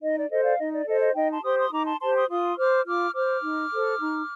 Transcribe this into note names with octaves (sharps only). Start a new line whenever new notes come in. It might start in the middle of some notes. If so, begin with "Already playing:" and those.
D#4 D#5
D5
A4 C5 D#5
D5 F5
D#4 D#5
D5
A4 C5 D#5
D#5
D#4 D#5 G5
A5 C6
G4 C5 C6 D#6
C6 D#6
D#4 A#5 D6
A5 C6
G4 C5 A5 C6
C6 D#6
F4 C6 D#6
C5 D6 F6
F4 D6 F6
C5 D6 F6
D#4
A4 C5
D#4